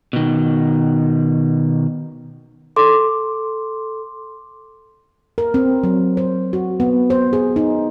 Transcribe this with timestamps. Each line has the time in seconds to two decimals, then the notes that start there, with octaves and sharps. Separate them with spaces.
0.13 B2 D#3
2.76 A4 C6 D6
5.38 A#4
5.54 C4
5.84 F#3
6.17 C5
6.53 F#4
6.80 B3
7.10 C5
7.33 G#4
7.56 D#4